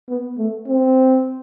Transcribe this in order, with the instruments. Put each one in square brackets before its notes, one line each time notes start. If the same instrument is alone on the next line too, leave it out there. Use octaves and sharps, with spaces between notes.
[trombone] B3
A3
C4